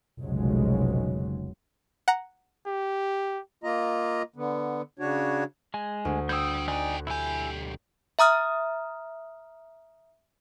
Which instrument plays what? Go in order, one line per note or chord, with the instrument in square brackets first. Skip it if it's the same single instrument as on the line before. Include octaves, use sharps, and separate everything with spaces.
[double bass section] F1 B1 C#3 F#3 G#3
[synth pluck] F#5 A#5
[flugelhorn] G4
[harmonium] A#3 F4 D#5 A#5
D3 B3
C#3 D4 F#4 C#5
[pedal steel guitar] G#3 G#5
[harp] D2
[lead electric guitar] G3 G5 [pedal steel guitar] D#6 G6 [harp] E6 G#6
[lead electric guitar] D3 G5 [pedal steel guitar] D#4 D5 G#5 [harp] F#6
[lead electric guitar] B1 G4 [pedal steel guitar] E4 G#5
[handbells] E5 A#5 D#6 F6